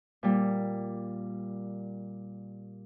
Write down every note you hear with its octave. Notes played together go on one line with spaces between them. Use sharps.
A#2 G3